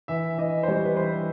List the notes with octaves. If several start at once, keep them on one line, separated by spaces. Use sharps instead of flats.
E3 E5
E3 D#5
C5
G3 C#5
B4
E3 C5